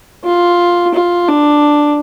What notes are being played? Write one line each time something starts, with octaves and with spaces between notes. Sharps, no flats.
F4
F4
D4